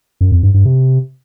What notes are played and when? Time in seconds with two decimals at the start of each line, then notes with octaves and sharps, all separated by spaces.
0.21 F#2
0.32 F2
0.43 G2
0.54 G2
0.65 C3